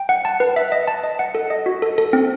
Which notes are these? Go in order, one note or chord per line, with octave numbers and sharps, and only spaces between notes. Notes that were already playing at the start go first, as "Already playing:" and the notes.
Already playing: G5
F#5
A5
B4
E5
D#5
A5
D#5
F#5
A4
D#5
F#4
A4
A4
C4